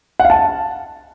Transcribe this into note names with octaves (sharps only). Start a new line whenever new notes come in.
F#5
F5
A5